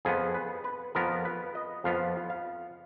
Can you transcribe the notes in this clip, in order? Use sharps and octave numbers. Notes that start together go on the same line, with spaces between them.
F2 F3 B3 G#4
B4
B4
F2 F3 B3 A#4
B4
D#5
F2 F3 B3 F5
F5